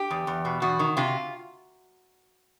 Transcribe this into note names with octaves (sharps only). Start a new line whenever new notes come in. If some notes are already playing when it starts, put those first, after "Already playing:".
Already playing: G4
E2
E2
B2
E2 F#4
D#3
C3 F4